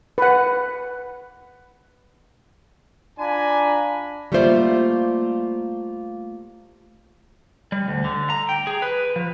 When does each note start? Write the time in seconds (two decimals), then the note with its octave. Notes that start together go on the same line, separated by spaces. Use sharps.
0.18 B4 F#5
3.19 D4 F4 G#5 A#5 B5
4.32 G3 A3 A#3 F4 C5 D5
7.72 G3
7.88 D2
8.04 D3
8.30 A#5
8.49 G5
8.67 G#4
8.82 B4
9.16 F3